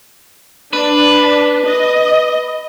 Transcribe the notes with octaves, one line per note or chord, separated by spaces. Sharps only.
D4 B4
D#5